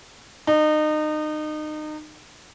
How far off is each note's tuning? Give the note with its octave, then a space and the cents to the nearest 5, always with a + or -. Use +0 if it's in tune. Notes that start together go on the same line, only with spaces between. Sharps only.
D#4 -30